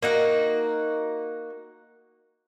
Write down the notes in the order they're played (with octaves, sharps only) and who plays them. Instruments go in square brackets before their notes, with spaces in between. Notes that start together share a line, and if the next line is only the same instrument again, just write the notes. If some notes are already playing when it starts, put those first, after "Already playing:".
[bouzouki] A#3 D#4 F#4